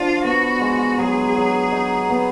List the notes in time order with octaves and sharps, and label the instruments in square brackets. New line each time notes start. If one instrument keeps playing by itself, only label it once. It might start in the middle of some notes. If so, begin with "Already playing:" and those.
Already playing: [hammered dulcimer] F3 D4 [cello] F4
[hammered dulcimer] B3 [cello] F#4
[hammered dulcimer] G#3
[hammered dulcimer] F#3 [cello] G#4
[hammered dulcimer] F#3
D#4
B3